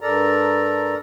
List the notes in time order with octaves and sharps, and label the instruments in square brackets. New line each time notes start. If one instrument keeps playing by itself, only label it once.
[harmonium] G2 A4 A#4 D5 A#5